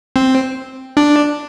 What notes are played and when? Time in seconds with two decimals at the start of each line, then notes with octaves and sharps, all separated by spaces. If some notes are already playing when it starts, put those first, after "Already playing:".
0.16 C4
0.97 D4